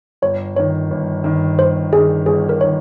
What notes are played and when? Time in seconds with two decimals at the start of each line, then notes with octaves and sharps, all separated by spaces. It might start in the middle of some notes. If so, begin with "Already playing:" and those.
0.22 G1 C#5
0.56 G2 D#3 C#5
0.91 G1
1.24 G2 D#3
1.59 G1 C5
1.92 G2 D#3 G#4
2.26 G1 G#4
2.49 A#4
2.61 D#3 C#5